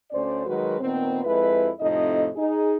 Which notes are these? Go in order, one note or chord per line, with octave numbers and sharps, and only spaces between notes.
D2 C#4 C5 D5
D#3 F#3 G#3 F#4 A#4 B4
A#2 D#3 B3 C4
F2 G#3 E4 B4
F2 A2 C3 D#4 D#5
D#4 G#4